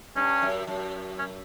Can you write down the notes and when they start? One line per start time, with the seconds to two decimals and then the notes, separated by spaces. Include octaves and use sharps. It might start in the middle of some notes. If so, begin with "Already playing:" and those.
0.16 G2 C#4
0.42 F#2
0.67 F#2
1.19 C#4